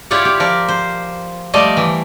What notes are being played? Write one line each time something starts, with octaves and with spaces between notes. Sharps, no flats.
E4 F4 G4 C#5 D5 F#5
G4
F3 A#4 D5
C5
F3 G3 A3 D5 D#5
E3